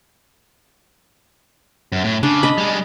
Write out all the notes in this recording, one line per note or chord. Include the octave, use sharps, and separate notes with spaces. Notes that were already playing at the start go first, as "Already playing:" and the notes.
F#2
A2
C#3 D4
D#5 B5
G3 G#3